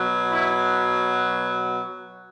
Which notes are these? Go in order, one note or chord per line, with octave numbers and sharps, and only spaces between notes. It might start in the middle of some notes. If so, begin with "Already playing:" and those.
Already playing: B2 F#3
E4